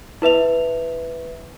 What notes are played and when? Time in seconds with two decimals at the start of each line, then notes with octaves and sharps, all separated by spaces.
0.22 E4 B4 E5 F7